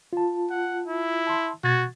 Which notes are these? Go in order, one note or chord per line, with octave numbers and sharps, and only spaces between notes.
F4 A5
F#5
E4
A5 C6
B2 F#4 G#6 A6